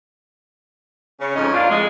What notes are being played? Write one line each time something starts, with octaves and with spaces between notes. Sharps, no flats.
C#3 C#4
F2 G#2 C#4 D#5
A#3 D4 F4
F2 G#3